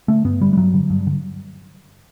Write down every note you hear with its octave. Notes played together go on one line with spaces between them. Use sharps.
D3 A3
G2 B3
D3 G3
G3
G2 F#3
D3
G2
D3